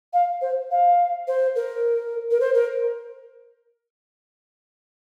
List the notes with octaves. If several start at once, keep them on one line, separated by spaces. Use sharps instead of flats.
F5
C5
F5
C5
A#4
A#4
C5
A#4